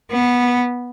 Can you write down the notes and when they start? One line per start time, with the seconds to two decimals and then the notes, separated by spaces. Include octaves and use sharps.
0.11 B3